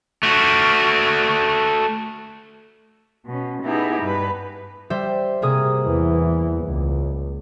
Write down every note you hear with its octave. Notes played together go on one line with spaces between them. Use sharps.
A3 F#4
B2 C#4
B3 D#4 E4 G4 G#4
G2 B4
G3 C5 E5
C3 A#3 G#4 D#6
E2 E3
C#2